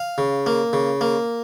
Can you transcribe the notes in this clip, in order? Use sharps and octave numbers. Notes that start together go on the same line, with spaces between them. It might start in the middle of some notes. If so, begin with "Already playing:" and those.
Already playing: F5
C#3
A#3
C#3
A#3